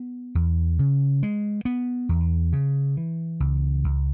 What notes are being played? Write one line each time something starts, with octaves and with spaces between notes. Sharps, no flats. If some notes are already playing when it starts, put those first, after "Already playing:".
Already playing: B3
E2
C#3
G#3
B3
E2
C#3
E3
C#2
C#2